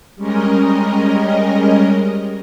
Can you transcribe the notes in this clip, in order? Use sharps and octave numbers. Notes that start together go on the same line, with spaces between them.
G3 G#3 C#4 A#4 D#5